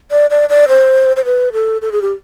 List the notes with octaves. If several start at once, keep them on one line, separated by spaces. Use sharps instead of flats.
D5
D5
D5
C5
C5
B4
A4
A4
G#4
G4